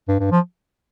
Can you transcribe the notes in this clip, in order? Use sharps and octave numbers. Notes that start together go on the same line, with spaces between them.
G2
G2
F3